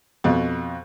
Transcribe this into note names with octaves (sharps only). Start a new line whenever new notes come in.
F2 B2